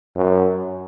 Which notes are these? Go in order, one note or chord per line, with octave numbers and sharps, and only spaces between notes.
F#2